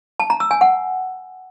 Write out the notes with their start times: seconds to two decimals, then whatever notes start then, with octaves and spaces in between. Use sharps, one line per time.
0.20 A5
0.30 A#5
0.40 E6
0.51 G#5
0.61 F#5